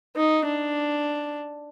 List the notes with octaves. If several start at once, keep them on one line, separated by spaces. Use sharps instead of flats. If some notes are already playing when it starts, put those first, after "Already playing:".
D#4
D4